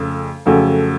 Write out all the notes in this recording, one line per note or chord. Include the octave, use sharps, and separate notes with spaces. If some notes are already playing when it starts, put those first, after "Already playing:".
Already playing: F2 C#3 A3 C#4
F2 C#3 F#3 A3 C#4